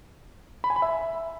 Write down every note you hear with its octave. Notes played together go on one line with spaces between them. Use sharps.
B5
G#5
B5
E5